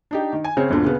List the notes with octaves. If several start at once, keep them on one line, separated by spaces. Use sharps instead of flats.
D4 D#4 G4
D#3
G#5
C#3 C4 C#5
G1 D2 A#2 D3
C#3 B3